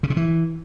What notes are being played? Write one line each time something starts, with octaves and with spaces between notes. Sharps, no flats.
C#3
C3
E3